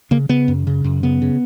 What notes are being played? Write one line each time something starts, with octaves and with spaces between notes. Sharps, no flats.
C#3 A#3
C#3 B3
F#2
C#3
F#2
C#3 B3
C#3